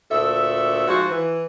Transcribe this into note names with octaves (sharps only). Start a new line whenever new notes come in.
D2 A#2 A4 E5
G#2 F3 F#4
E3